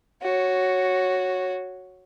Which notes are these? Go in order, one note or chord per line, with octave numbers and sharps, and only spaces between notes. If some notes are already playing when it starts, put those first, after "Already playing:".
F#4 C#5